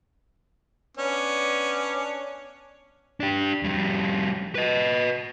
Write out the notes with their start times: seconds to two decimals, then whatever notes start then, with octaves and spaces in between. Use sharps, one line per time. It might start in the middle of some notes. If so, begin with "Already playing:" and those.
0.97 B3 C#4 D4
3.20 D4 G4
3.63 F2 G3
4.55 B4 D#5